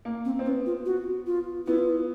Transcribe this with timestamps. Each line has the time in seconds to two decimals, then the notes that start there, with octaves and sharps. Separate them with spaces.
0.05 A#3
0.25 C4
0.39 C4
0.45 B3 C#4
0.66 F4
0.86 F#4
1.26 F4
1.67 B3 E4
1.78 F4
1.90 E4